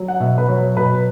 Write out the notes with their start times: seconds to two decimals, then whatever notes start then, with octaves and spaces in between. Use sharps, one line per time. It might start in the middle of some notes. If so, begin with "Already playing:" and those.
Already playing: F#3
0.08 F#5
0.20 B2 E5
0.38 B4
0.48 F#3 C#5
0.77 B2 B4